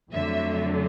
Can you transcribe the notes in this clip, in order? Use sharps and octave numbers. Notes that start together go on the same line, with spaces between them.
F2 D3 F#3 A3 E5